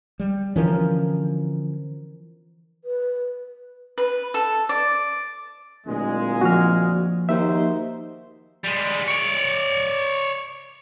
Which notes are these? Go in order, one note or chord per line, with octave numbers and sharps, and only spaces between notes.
G3
D3 E3 F3 C#4 A#4
B4
B4
A4
D5
D1 A#2 G#3
F3 A#3 F#4 F6
D#2 D#4 F#4 C5 E5
G3 G#3
C#5 D5